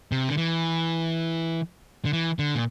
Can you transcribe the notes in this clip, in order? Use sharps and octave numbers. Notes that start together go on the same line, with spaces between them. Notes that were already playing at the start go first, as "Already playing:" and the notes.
C3
D3
E3
D3
E3
D3
A#2